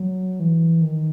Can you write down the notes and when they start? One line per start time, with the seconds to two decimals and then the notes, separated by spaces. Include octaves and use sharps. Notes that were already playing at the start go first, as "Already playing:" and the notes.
Already playing: F#3
0.40 E3
0.82 D#3